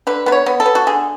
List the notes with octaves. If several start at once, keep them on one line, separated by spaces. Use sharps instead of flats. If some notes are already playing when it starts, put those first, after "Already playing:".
D3 B4
B3 B4
C#5
B3
A4
B3
F#4
D3 G#4